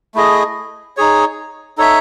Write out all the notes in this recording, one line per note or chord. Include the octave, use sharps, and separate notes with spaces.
A3 E4 G#4 D#5
D#4 G#4 C#5
D#4 A4 C#5 E5